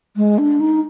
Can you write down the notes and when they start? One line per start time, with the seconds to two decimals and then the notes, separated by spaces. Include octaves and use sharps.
0.16 G#3
0.38 D4
0.60 D#4